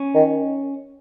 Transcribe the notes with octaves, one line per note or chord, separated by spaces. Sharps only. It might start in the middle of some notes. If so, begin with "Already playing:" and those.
Already playing: C#4
D#3